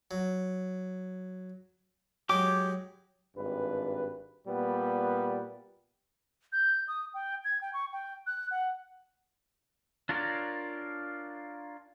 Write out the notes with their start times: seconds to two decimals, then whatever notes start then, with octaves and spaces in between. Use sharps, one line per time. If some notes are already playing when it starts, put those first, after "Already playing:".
0.11 F#3
2.29 F#3 G#3 G4 D6
3.37 G#1 G2 B4
4.48 A#2 G3 B3
6.52 G6
6.88 D#6
7.14 G5
7.44 G#6
7.61 G5
7.74 C#6
7.93 G5
8.27 F#6
8.51 F#5
10.09 D4 F4 A#4 C#5 D5